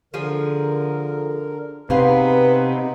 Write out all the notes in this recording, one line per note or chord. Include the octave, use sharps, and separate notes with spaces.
D3 F3 G#4 A#4
C3 B3 D#4 G#4 B4 C5 F5